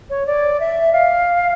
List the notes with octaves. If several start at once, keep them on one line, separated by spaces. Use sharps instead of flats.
C#5
D5
E5
F5